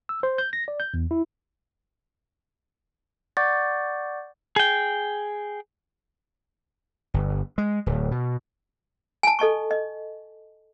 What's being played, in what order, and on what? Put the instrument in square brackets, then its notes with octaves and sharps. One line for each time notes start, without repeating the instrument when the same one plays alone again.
[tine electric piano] E6
C5
G6
A#6
D5
G6
E2
E4
[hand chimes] D5 F#5 C#6 D6 G6 A6
[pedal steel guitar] G#4 G5
[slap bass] G1
G#3
D1
B2
[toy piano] G#5 A5
A4 D#5 A5 C#6
D#5